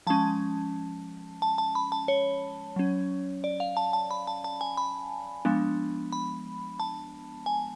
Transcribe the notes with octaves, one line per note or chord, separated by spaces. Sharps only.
F3 G#3 C#4 A5
A5
A5
B5
A5
C#5
F#3 C#4
D5
F5
A5
A5
B5
A5
A5
G#5
B5
F3 G#3 B3 D4
B5
A5
G#5